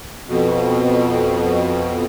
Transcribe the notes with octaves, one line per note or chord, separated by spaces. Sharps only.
F2 B2